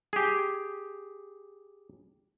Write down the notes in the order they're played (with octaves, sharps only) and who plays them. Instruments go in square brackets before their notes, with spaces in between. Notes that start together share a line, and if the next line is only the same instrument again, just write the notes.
[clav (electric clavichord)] G4 G#4